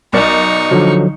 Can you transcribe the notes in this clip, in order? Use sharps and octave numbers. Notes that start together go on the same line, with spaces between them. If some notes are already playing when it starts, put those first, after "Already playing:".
B1 D#4 A#4 D5 C#6
D3 F3 F#3